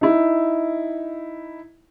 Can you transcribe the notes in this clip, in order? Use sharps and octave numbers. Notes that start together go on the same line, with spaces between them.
D#4 E4